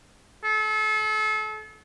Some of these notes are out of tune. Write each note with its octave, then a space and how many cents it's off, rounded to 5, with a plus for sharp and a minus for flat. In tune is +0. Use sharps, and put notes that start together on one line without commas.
A4 -35